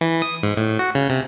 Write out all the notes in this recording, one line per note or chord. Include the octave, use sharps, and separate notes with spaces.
E3
D#6
G#2
A2
F#4
C#3
C3